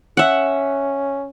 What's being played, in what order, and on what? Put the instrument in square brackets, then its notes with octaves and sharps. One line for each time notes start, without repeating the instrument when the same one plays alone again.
[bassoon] C#4 [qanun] E5 F#5